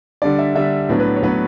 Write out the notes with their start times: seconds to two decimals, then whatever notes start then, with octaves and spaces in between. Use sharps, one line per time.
0.22 D3 G3 D4 D5
0.39 E5
0.55 D3 G3 D4 E5
0.89 A2 F#3 B3 D4
1.00 B4
1.16 C#5
1.22 A2 F#3 B3 D4 B4